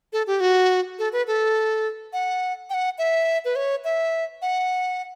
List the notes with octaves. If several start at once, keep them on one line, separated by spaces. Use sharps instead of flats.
A4
G4
F#4
A4
B4
A4
F#5
G5
F#5
E5
B4
C#5
E5
F#5